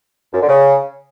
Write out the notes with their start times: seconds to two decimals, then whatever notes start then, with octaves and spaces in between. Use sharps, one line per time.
0.33 F#2
0.40 D3
0.48 C#3